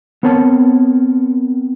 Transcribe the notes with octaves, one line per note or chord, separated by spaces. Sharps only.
B3 C4 A#4 C#5 A5